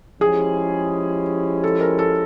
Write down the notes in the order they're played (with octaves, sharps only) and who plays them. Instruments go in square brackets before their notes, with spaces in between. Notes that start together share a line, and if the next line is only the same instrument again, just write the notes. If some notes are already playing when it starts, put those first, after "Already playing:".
[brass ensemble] F3 G#3 C#4 E4 G4 [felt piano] G#4
[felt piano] A4
A#4
A4